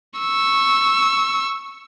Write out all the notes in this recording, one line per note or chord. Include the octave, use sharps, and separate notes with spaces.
C#6 E6